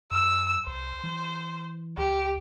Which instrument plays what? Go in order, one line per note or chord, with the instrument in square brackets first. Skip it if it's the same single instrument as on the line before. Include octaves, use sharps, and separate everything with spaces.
[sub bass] F#2 [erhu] E6
[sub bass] C2 [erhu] C5
[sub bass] E3
[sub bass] C#2 [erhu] G4